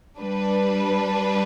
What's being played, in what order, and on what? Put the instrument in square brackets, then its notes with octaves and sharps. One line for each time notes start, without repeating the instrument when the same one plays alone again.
[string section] G3 D4 B4